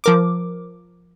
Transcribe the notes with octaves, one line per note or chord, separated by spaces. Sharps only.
F3 A#4 D6